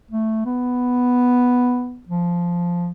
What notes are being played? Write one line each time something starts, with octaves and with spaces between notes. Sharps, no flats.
A3
B3
F3